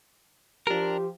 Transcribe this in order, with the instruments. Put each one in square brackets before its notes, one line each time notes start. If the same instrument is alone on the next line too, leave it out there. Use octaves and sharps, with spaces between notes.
[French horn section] F3 G4 [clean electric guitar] D4 A#4